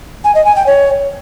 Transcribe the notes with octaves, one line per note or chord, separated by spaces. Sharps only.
G#5
D#5
G#5
G5
C#5